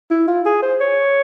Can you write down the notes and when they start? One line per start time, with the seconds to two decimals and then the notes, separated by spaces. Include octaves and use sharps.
0.11 E4
0.28 F4
0.46 G#4
0.62 C5
0.81 C#5